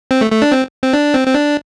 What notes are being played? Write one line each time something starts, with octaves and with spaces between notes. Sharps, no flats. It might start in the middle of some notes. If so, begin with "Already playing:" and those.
C4
A3
A3
D4
C4
C4
D4
C4
C4
D4